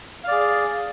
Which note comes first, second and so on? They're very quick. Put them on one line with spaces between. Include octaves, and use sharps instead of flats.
F5 D5 G#4